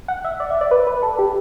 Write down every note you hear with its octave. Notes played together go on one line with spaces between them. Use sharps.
F#5
E5
D5
E5
D5
B4
B4
A4
G4